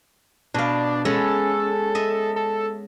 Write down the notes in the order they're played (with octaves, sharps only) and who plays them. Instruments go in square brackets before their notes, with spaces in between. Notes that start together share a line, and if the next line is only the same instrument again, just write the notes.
[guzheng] B2 F5 [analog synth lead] D4
[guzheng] G#3 B3 C#4 [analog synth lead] A4
[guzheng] D#5 E5
[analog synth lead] A4